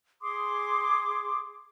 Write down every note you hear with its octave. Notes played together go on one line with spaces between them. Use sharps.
G#4 C6 D6 D#6